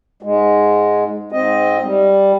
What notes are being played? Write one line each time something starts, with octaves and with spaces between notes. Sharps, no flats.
G#2 G#3
G#2 C4 D#5
G3